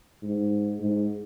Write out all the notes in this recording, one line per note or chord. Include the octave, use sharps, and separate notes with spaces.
G#2
G#2